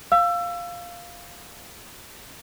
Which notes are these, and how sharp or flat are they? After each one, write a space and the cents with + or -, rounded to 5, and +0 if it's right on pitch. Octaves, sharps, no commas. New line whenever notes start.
F5 +0 E6 +25